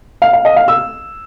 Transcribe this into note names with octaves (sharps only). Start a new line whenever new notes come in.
F5
F5
D#5
F5
E6